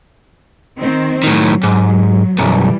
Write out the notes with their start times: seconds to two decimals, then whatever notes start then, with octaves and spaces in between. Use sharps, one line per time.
0.78 D#3 C4
1.24 A2 D#3 F#3
1.63 G#2
2.38 B1 F#2 E3 G3